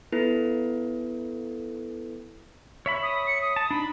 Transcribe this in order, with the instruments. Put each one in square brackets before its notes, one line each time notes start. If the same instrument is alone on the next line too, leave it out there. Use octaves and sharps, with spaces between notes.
[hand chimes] B3 E4 A4 B4
[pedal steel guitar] C#5 E5 B5
[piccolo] D#6
C#7
D#6
[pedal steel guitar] A5
[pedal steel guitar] D4 D#4 [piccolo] B5